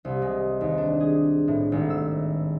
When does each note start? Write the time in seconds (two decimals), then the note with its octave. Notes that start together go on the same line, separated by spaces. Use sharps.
0.05 C2
0.22 G#3
0.61 D#2
0.78 D4
1.00 G#4
1.48 A2
1.72 G#1
1.90 E6